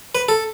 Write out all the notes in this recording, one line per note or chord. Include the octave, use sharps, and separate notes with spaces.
B4
A4